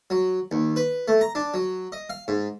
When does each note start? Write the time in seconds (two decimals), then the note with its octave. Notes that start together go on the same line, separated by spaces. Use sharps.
0.10 F#3
0.52 D#2
0.76 B4
1.08 A3
1.21 A#5
1.35 D4
1.54 F#3
1.92 D#5
2.10 F5
2.28 G#2